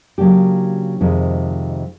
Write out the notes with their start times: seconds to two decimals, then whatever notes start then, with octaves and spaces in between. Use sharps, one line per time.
0.18 C#3 F#3 A#3 D4 G4
1.01 F2 C3 D#3 G#3